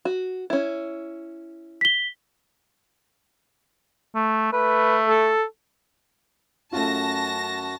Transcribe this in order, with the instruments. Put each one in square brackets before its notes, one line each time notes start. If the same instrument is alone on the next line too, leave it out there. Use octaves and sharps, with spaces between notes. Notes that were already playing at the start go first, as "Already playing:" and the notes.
[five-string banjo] F#4
C#4 E4
[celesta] B6 G7
[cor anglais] A3
[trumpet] A3 [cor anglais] B4
[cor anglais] A4
[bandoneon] F#2 F#4 [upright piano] A3 C#4 F4 [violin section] A5 A#6